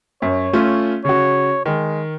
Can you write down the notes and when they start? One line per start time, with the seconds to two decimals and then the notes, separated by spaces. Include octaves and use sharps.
0.22 F#2 C#5
0.53 A3 C#4 F4
1.05 C#3 F#4 C#5
1.66 D#3 G#3